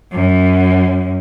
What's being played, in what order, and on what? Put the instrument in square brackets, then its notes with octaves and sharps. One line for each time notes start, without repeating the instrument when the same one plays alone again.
[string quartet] F#2